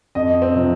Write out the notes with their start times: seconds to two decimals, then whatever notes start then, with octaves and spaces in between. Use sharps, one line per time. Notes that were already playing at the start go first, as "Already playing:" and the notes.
0.15 F2 D#5
0.42 C4
0.55 C3 F3